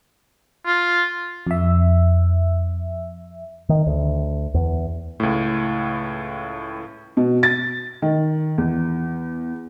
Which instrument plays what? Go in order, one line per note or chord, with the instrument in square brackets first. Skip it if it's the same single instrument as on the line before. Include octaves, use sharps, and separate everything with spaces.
[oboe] F4
[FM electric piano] F2 E5
[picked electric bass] D#3
D2
E2
[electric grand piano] C#2 A2
[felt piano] B2
A6
D#3
E2